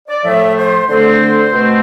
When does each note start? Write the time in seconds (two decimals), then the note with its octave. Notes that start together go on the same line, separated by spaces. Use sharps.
0.09 D5
0.24 A2 F3 A3 E5
0.57 C5
0.88 D3 A3 C4 C5
1.52 B2 A3 C4